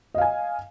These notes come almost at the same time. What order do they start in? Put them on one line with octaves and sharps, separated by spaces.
D#5 F5 G#5